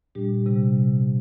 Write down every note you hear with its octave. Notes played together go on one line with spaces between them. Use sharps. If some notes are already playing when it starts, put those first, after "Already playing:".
A#2 G3 D4 G4
C3 G3